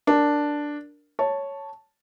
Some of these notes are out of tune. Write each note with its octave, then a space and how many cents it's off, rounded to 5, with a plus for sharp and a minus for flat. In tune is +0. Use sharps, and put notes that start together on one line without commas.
D4 +0 A#4 +0
C#5 +0 A5 +0